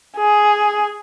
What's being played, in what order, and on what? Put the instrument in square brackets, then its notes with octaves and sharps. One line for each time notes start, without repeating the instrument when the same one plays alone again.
[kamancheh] G#4